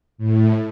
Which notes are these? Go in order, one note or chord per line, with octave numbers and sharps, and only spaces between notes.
A2